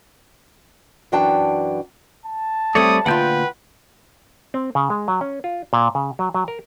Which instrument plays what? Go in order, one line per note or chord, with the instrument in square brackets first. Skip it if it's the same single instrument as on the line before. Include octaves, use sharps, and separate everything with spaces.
[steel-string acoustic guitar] F#2 E3 D4 F#4 G5 A5
[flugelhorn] A5
[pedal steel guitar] G3 C#5 D5 [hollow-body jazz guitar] A3 C4 [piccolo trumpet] D#6
[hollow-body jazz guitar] D2 A#2 F4 [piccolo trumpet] B4 [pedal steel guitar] F#5 G5 G6
[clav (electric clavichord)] C4
C#3
G#3
F#3
C#4
F4
A#2
C#3
F#3
F#3
A#4